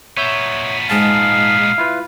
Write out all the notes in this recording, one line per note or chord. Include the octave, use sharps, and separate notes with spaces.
A#2 B3 C#5 E5 G6
G#2 G#3 G#4 F5 A5
E4 F4 B4